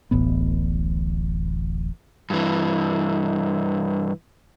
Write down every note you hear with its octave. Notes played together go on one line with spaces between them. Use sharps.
D1 A1 B3
G2 E3